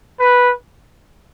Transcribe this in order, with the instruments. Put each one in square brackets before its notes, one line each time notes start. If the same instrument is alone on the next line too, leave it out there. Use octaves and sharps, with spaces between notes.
[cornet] B4